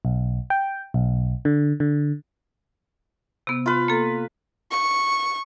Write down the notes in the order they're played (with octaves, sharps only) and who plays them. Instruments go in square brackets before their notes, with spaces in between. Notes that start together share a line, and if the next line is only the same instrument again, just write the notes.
[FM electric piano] B1
G5
B1
D3
D3
[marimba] C3 B3
[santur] F4 B4
[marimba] A#3 A4
[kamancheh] C#6